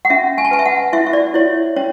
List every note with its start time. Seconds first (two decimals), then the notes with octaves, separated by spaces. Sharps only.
0.05 F#5
0.10 C#4 E5
0.38 G#5
0.45 A5
0.51 B4 G#5
0.59 E5
0.66 F#5
0.93 E4 E5
1.06 E5
1.13 D5
1.34 E4 C#5
1.76 C#4 C#5